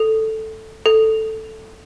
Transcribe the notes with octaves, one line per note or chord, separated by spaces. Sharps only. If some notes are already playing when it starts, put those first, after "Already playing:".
Already playing: A4
A4